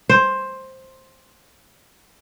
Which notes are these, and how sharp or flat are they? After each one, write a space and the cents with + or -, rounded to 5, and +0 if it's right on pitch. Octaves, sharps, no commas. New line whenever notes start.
C5 +10